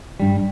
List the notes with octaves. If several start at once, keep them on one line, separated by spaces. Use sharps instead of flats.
G2 G3